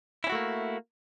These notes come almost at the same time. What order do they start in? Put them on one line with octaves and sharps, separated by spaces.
E4 C#4 F#4 A3 A#3